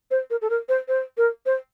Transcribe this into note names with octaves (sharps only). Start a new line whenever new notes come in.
C5
A#4
A4
A#4
C5
C5
A#4
C5